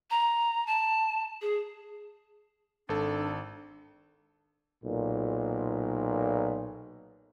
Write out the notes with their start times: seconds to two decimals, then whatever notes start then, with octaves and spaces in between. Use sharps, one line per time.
0.11 A#5
0.67 A5
1.42 G#4
2.89 G#1 D4 A4
4.84 B1 A#2